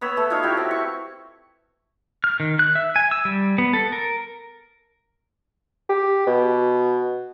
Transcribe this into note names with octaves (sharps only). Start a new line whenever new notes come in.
B3 C#5 B5 E6
A3
D#4 F4 F#4 C#5
E4 F#4 G4
C4
C#6
F6
D#3
F#6
E5
G#5
E6
G3
B3
A4
A#4
G4
B2